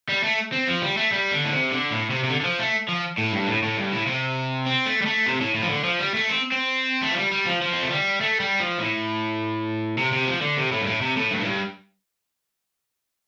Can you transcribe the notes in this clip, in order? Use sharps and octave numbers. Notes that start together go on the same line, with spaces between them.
G3
A3
C4
F3
G3
A3
G3
D3
A2
C3
D3
A2
C3
C3
D3
D3
F3
A3
F3
A2
G2
A2
A2
G2
A2
C3
C4
A3
G3
A3
C3
A2
A2
F3
D3
F3
G3
A3
C4
C4
A3
F3
G3
G3
F3
F3
C4
A3
G3
A3
G3
F3
A2
C3
C3
F3
D3
C3
A2
G2
A2
C3
A2
G2
A2
G2